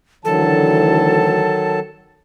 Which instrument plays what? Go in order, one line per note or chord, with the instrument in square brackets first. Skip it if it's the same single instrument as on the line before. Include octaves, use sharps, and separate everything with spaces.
[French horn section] D2 E3 [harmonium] D#3 F#3 A5 [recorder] A4